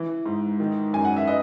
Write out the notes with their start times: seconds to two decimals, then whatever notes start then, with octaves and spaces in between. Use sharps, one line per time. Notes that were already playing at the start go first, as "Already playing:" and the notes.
Already playing: E3
0.26 G#2
0.60 D#3
0.93 F#2 G#5
1.05 F#5
1.16 E5
1.27 B4 D#5